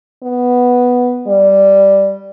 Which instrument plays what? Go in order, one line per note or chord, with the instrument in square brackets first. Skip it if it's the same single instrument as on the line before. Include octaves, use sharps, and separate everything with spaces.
[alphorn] B3
G3